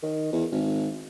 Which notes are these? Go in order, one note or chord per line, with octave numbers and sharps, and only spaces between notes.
D#3
E2
G#1